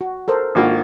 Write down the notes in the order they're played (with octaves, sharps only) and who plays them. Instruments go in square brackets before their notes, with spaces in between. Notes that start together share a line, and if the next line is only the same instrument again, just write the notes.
[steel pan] F#4
A4 A#4 C5
[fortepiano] G#1 A#3 F4 [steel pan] D4 F#4